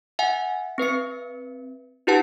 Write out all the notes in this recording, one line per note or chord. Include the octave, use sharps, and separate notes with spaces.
E5 F#5 G#5
C4 B4 E5 C#7
D#4 F4 G4 B4 F#5 A5